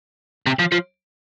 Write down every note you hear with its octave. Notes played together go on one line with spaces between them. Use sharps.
C3
F3
F3